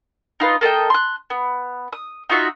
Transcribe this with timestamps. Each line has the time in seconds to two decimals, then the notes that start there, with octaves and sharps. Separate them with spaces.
0.40 D#4 F4 B4
0.61 A#3 A4 D#5 G5
0.90 C6 F#6
1.30 B3
1.93 D#6
2.30 D#4 F4 F#4 E5